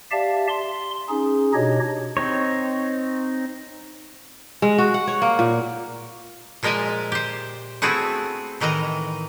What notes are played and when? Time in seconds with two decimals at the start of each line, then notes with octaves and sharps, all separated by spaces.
0.11 G4 D5 E5 F5 A5
0.48 C6
1.09 C#4 D#4 G#4
1.54 B2 D4 D#4 G4 C#5 D#5
2.17 C4 D#4 C#5
4.62 G#3
4.78 F#4
4.94 F#5
5.07 C#5
5.22 A#3
5.39 A#2
6.63 A#2 F3 G#3 A#4 E5 G#5
7.12 G4 C5
7.82 A3 B3 C4 E4 F#4 G#4
8.60 A2 D#3 E3 D#5 A#5